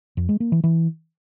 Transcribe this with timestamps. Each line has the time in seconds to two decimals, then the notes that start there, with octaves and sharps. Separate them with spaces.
0.17 F2
0.29 G#3
0.40 A#3
0.52 E3
0.64 E3